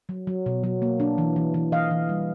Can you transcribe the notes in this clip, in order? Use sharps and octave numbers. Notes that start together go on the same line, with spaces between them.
F#3
F#3
B2
F#3
A#3
D4
E3
E3
E3
E3 D#5 F5
E3
G3